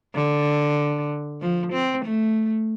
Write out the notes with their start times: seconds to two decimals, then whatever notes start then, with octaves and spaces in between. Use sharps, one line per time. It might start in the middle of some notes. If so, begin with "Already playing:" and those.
0.15 D3
1.41 F3
1.72 C4
2.05 A3